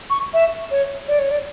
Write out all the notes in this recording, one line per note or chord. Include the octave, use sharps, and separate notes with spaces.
C#6
E5
C#5
D5
C#5
D5